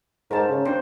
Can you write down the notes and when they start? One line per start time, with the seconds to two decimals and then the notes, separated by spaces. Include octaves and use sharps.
0.31 G#2 A#4 C5 A5
0.49 C#3
0.66 C4 D4 C5